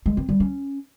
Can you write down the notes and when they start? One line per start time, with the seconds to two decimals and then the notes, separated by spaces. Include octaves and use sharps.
0.06 G#3
0.17 C4
0.29 G3
0.40 C#4